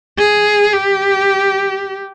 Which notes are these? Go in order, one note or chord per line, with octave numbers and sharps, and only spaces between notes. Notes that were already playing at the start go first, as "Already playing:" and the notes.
G#4
G4